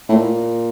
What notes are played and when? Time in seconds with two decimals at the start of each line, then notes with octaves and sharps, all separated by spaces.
0.09 A2
0.12 A#2